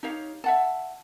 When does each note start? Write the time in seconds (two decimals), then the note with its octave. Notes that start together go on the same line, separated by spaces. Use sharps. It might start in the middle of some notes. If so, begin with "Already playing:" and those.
0.03 D#4 G4 C#5 F5
0.44 E5 F#5 A5